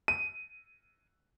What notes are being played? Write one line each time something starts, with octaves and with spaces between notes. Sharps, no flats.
D#7